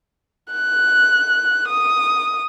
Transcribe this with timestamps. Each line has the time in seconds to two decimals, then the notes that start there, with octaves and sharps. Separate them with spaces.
0.51 F#6
1.68 D#6